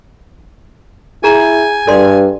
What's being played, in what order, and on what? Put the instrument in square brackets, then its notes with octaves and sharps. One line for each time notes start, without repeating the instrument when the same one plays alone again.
[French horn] E4 [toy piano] G#4 A#5 [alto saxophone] G#5
[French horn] G2 [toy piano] A4 D5 C6